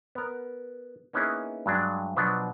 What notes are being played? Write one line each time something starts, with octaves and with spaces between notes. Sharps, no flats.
B3 A#4
A#3 B3 C#4 D#4 E4 G#4
G2 F#3 G#3 D4
B2 F3 F#3 B3 D4